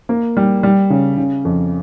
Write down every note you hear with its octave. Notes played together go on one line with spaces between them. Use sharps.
A#3
G3
G3
C#3
C#3
F2